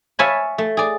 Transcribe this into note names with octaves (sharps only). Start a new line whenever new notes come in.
C#5 E5 F5 G#5 A5 B5
A3
G#4 D5